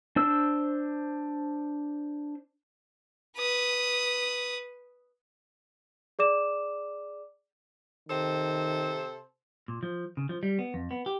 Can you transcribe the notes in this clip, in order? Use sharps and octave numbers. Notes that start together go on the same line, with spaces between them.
D4 C5 E6
B4 D#6
G#4 D5 D6 E7
C3 D#3 A4 C5
A#2
F3
C#3
F3
G3
B3
F2
B3
G4